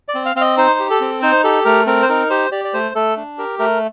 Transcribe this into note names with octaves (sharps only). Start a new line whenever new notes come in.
D5
C4
F5
C4 F5
D#5
D#4 C5
G4
A4
C4
D#4 C5
G4 A4
A3 A#4
C4 A#4
C5
D#4 A#4
G4 C5
G4 D5
D5
A3 C5
A3 A4
D4
G4 A#4
A3 A#4